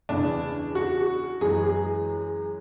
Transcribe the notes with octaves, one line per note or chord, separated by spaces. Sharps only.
E2 C#3 E3 D4
F#4
F#2 E3 G#3 G#4